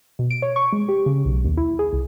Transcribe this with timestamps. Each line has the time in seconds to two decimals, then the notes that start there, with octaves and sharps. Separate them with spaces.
0.19 B2
0.30 D7
0.42 C#5
0.56 C#6
0.72 G#3
0.88 G4
1.06 C#3
1.25 B1
1.44 D#2
1.57 E4
1.79 G#4
1.93 C2